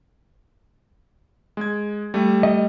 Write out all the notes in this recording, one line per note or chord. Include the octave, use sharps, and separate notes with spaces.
G#3 G#6
G3 A3
D#5